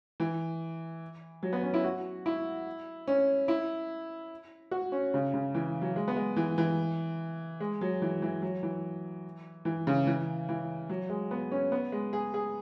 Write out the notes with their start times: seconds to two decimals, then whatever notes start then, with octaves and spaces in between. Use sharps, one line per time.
0.20 E3
1.43 F#3
1.53 B3
1.63 C#4
1.74 E4
1.84 F#4
2.26 E4
3.08 C#4
3.48 E4
4.71 F#4
4.92 C#4
5.14 C#3
5.34 C#3
5.55 E3
5.81 F#3
5.96 G#3
6.08 B3
6.16 G#3
6.37 E3
6.58 E3
7.60 G#3
7.81 F#3
8.02 E3
8.22 E3
8.42 F#3
8.63 E3
9.65 E3
9.87 C#3
10.07 E3
10.49 E3
10.89 F#3
11.09 G#3
11.31 B3
11.52 C#4
11.72 B3
11.92 G#3
12.13 G#4
12.34 G#4